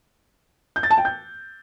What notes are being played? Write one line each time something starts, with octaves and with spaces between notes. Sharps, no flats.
G6
A6
A5
G5
G6